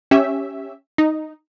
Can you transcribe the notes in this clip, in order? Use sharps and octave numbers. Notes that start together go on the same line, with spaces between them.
C#4 G4 E5
D#4